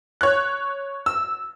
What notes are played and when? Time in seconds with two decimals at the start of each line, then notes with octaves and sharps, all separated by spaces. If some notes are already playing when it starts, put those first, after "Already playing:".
0.21 C#5 F#6
1.06 E6